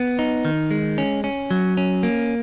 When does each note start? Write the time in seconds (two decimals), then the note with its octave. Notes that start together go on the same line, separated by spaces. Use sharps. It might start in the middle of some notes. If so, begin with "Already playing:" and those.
Already playing: B3
0.19 D#4
0.45 D#3
0.71 G#3
0.98 C#4
1.24 C#4
1.51 F#3
1.77 C#4
2.03 A#3